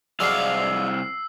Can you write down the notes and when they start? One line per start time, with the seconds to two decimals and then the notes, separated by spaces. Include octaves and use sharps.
0.20 C2 F#3 G#3 D5 F5 E6 C7